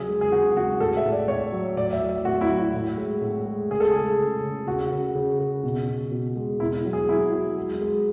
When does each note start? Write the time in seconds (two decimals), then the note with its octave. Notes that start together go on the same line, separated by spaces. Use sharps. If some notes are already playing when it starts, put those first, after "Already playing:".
Already playing: C#3 F#3 G#4
0.09 G#3
0.21 G#4
0.31 C#3 F#4
0.56 G#3 F#4
0.80 A2 A4
0.97 E5
1.05 A2
1.12 D5
1.28 A2 C#5
1.52 F#3
1.77 A2 D5
1.93 E5
2.01 F#3
2.09 E5
2.25 A2 F#4
2.41 E4
2.49 F#3
2.58 F#4
2.73 A2
2.97 G#3
3.21 A2
3.46 G#3
3.70 C#3 G#4
3.80 A4
3.91 G#3 G#4
4.18 C#3
4.43 C#3
4.67 C#3 F#4
4.91 C#3
5.15 C#3
5.39 C#3
5.63 B2
5.88 B2
6.11 B2
6.36 G#3
6.60 B2 E4
6.85 F#3
6.93 G#4
7.09 F#3 E4
7.33 F#3
7.57 G#3
7.81 G#3